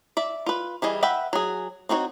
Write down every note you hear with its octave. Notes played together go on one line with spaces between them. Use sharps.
D5 E5
F4 B4
E3 G3 G#4 D#5
B4 E5 F#5 G5 B5
F#3 G#4
C4 D#4 F#4 B4 C#5